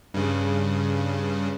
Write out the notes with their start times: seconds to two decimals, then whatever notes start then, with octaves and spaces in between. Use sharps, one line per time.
0.14 G2 C#3